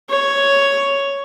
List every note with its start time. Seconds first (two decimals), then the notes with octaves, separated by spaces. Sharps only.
0.10 C#5